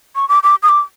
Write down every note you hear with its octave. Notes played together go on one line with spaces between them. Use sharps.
C#6
D6
D6
D#6
D6